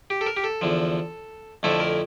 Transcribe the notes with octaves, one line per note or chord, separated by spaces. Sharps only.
G4
A4
A#4
G4
A4
E2 D3 F3
F2 D3 F3 A3 E4 A4
A#4